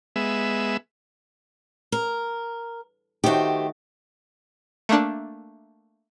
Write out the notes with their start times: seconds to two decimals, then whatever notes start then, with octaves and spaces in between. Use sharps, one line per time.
0.16 G#3 B3 E5
1.92 A#4
3.24 D#3 A3 F#4 G4 C5
4.89 A3 A#3 D4